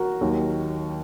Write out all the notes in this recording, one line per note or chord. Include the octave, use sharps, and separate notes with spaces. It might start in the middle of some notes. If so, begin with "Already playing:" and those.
Already playing: F#4 A#4
D#2 D#3 F#3